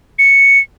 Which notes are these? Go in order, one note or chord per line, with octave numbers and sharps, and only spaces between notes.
C#7